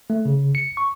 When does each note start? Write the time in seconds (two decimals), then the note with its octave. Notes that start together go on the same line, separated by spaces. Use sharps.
0.10 A3
0.25 C#3
0.55 C#7
0.77 C#6